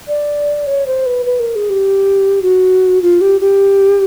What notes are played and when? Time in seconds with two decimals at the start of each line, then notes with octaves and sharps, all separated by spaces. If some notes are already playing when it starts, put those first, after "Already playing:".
0.08 D5
0.67 C#5
0.87 C5
1.06 B4
1.26 B4
1.40 A#4
1.56 G#4
1.70 G4
2.42 F#4
3.02 F4
3.21 G4
3.41 G4